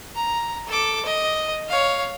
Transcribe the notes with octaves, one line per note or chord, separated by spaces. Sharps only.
A#5
A4 D6
D#5
C#5 F5